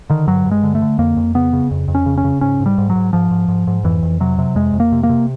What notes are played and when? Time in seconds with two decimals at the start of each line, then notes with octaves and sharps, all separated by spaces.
0.10 D3 D#3
0.27 G2 F#3
0.46 G2
0.51 G#3
0.63 D3
0.75 A3
0.82 D3
0.99 F2 A#3
1.17 F2
1.35 C#3 B3
1.53 C#3
1.71 F2
1.88 F2
1.95 C#4
2.06 C#3
2.18 C#4
2.24 C#3
2.41 G#2 C#4
2.60 G#2
2.66 G3
2.78 G#2
2.90 F#3
2.95 G#2
3.13 G#2 F3
3.31 G#2
3.48 G#2
3.67 G#2
3.84 F2 E3
4.03 F2
4.20 C3 F#3
4.38 C3
4.55 F2 G#3
4.74 F2
4.80 A#3
4.92 C3
5.03 A#3
5.09 C3